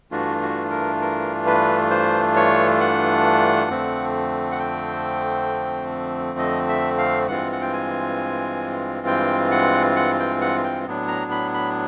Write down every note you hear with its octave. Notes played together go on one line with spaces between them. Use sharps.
G2 E3 A3 D4 F4 F#4
F#4
A#4
A#4
B4
C5
C#5
F#5
F2 D3 F3 A3 C4
F#5
G5
D#5
E5
F5
G2 E3 G#3 C4 F4 F#5
F#5
G5
G#5
G5
F#5
F#5
G5
F#5
G5
A2 F#3 B3 D4
A#5
B5
B5